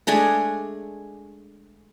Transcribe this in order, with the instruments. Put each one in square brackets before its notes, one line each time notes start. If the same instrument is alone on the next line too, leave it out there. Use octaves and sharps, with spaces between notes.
[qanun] G#3 A3 D4 G#4